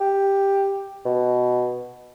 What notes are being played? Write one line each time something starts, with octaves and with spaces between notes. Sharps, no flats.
G4
B2